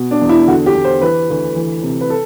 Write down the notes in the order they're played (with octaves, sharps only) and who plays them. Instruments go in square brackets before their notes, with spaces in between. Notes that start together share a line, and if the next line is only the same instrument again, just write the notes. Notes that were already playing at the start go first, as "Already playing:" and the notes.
Already playing: [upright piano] B2
D4
E2
E4
D3 F#4
G4
E2
C5
E3 B4
D2
E3
C3
B4
A4